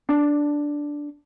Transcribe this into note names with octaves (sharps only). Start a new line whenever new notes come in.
D4